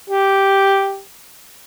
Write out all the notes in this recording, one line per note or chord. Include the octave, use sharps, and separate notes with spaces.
G4